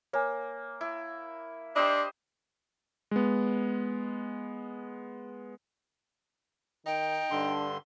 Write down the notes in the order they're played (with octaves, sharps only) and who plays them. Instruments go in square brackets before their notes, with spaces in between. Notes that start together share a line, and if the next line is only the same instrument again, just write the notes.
[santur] A#3 [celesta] C#5 G#5
[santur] E4
[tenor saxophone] D4 [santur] G4 C5 D#5 [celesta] B5 E6
[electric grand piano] G#3 B3
[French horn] D#3 [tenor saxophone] D#4 [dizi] G5
[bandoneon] G2 D3 C6 [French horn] D4